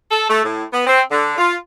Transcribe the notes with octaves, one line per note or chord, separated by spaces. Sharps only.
A4
A3
A2
B3
C4
D3
F4